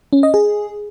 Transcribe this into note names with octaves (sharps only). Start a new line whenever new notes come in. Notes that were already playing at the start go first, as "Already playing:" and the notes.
C#4
D#5
G#4